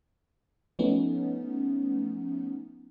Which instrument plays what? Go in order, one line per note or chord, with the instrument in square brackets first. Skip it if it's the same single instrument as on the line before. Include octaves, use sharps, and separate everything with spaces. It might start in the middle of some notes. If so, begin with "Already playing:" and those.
[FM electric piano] F3 A3 B3 C#4 D#4